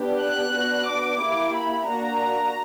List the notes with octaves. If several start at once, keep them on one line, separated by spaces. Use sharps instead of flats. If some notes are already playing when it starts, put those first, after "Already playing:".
Already playing: B3 D4 G4
F#6
B3 D4 F#4
D6
A#3 E4 G4
B5
A#3 D4 F#4 A#5